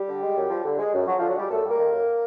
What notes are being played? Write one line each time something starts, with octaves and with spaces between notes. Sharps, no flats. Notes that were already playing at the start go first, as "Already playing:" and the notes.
Already playing: G3 G4
D3
G#3
F#2
F3
D3
G#3
F#2
F3 F#3 F#4
F3 F4
D3
F#3 F#4
G3 G#3 G4
F#2 A3 A4
G3
A#3 A#4
D#3
F#2